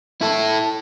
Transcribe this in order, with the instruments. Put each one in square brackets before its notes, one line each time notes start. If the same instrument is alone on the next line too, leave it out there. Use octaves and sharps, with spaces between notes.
[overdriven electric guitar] E4 A4